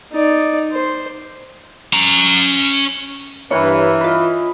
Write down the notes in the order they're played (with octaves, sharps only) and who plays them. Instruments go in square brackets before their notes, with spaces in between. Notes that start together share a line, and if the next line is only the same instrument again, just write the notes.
[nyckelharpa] D#4 D5
C5
[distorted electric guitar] C#4 A#5
[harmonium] G2 B4 [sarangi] E3 [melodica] E4 A#4 [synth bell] C#5
[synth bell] F4 B5 [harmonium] D#5